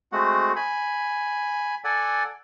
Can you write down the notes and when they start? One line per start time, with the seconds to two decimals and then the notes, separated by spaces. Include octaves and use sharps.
0.12 G#3 A3 C4 F#4 F#5
0.56 G#5 B5
1.84 A4 D5 F#5 G#5